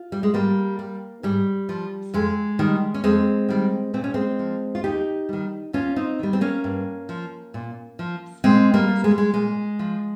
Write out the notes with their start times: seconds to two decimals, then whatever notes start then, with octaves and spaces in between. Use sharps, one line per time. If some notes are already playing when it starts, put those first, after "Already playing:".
Already playing: F4
0.12 G3
0.23 G#3
0.34 G#2 G3 A#3
0.79 G3
1.23 G#2 G3
1.69 F3
2.14 F2 G#3
2.59 D#3 G3
2.94 C#4
3.04 F2 G#3 C4
3.49 D#3 G3
3.94 A#2 C4
4.04 C#4
4.14 G#3 C4
4.39 F3
4.75 F4
4.84 D#2 D#4 G4
5.29 D#3 G3
5.73 D#2 C#4 F4
5.96 C4 D#4
6.19 D#3 G3
6.33 C4
6.41 A#3 C#4
6.64 G2
7.09 F3
7.54 A#2
7.99 F3
8.44 A#2 G#3 C4
8.74 G3 A#3
8.89 G3
9.04 G#3
9.11 G3
9.18 G#3
9.34 A#2 G#3
9.79 F3